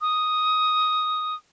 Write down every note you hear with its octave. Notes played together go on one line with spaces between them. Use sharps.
D#6